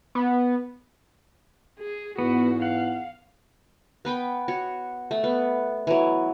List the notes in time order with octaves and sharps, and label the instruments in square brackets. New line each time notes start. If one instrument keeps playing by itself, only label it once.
[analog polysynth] B3
[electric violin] G#4
[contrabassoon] E2 [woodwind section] G#2 [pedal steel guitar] B3 [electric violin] F#4
[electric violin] F5 [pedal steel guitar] F#5
[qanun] B3 B4 G5 B5
F#4 C#5
A3
B3
E3 F#3